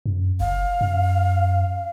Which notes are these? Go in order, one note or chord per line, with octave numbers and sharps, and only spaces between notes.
F#2
F#1 F5
F#2